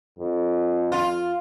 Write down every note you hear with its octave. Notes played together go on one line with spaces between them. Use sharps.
F2
F4